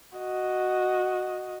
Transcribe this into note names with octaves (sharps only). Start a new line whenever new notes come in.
F#4 D#5